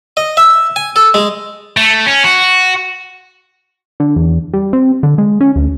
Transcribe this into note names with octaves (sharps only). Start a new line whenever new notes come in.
D#5
E5
G#5
A4
G#3
A3
C#4
F#4
D3
E2
G3
C4
D3
G#3
C#4
D2